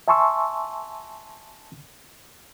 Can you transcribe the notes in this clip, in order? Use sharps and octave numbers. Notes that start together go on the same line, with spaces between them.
E5 G#5 A5 C6 C#6 E6